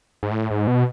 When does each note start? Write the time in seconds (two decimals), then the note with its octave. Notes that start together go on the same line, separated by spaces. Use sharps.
0.23 G#2
0.31 A2
0.51 G#2
0.67 B2